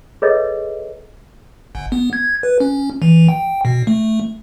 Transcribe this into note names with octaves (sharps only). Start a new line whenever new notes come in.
G#4 A4 B4 C#5 D#5 E5
G1
B3
G#6
B4
C#4
E3
G5
B2
A3